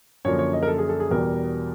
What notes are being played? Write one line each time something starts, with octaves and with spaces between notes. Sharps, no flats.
F#2 D3 F3 A#3 C#5
C#5
D#5
A#4
A4
G#4
A4
G#4
E2 B2 G3 A#4